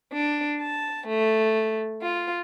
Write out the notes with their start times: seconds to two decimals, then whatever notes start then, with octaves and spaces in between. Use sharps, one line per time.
0.14 D4
0.61 A5
1.08 A3
2.03 F4